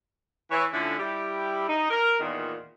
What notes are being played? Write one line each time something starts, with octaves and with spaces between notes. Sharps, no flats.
E3 C#5
D3 F3 A3 C#4 D4 E4
G3 E4 G4
D#4
A#4
E2 A#2 D#3